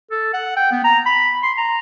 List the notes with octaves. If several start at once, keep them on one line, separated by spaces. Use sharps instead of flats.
A4
F#5
G5
B3
A#5
B5
C6
A#5